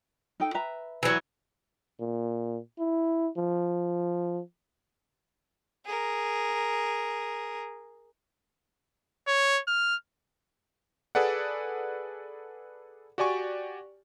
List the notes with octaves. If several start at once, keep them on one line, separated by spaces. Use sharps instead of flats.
D#4 A4 G5
B4 E5 A#5
E3 F#3
A#2
E4
F3
G#4 A#4
C#5
F6
G#4 A4 B4 D5 F#5
F#4 G4 D5 G#5 C#6